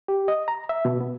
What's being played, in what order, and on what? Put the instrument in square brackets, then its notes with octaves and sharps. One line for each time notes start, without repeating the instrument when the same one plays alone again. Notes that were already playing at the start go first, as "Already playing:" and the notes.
[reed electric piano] G4
D#5
A#5
E5
B2
B3